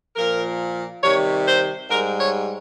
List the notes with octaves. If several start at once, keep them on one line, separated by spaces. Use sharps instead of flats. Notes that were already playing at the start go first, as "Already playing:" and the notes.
A#2 F3 A#4
C3 D#3 G3 C#5
C5
G#2 G3 A#4
C#5